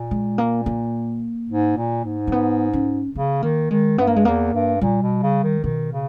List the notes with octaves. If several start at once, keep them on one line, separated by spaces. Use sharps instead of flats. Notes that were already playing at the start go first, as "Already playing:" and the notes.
Already playing: A#2
G#3
A#3
A#3
G#2
A#2
G#2
A#3
B3
C#4
C#3 B3
D#3 A#3
D#3 G#3
G2 B3
A#3
G#3
E2 A#3
G2
A#2 G3
B2
C#3
D#3
B2 D#3
C#3